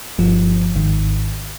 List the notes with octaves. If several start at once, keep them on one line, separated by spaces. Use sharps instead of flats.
G1 G2 F3
G#1 G#2 D#3